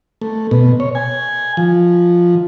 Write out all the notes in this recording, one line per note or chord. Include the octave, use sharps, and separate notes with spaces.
A3
B2
C#5
G#5
F3